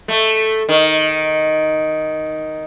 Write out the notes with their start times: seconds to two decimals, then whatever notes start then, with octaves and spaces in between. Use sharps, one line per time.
0.08 A3
0.69 D#3